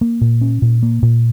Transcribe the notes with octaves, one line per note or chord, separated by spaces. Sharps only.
A#3
A#2
C#4
A#2
A#3
A#2